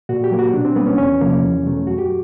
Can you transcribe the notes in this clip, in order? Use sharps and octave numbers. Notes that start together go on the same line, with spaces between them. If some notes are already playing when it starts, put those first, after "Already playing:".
A#2 F#4
G4
F#3 A#3
F#4
B2 D4
C4
G3 A#3 B3
C#4
E2 C#4
C3 F3 A#3
E2
B2 F#3 A3
F#2 F#4
G4